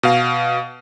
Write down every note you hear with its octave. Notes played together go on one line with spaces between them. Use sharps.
B2 F5